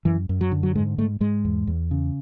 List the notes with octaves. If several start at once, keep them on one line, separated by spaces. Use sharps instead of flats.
F#2 E3
F#2
F#3
D3
F#3
G#2 G#3
G#2 A3
G#2 G#3
E2
E2
C#3